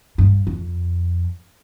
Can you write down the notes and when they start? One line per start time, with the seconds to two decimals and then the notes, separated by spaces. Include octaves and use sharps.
0.18 G2
0.47 F2